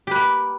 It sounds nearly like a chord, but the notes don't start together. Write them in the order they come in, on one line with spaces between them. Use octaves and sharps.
G4 B4 A#3